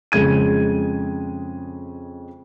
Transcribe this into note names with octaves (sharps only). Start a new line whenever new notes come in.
F2 C#3 G#3 G#6 D#7